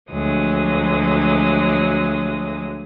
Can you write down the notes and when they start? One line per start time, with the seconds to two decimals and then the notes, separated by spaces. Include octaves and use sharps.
0.11 D2 F3 F#3 G#3 D#6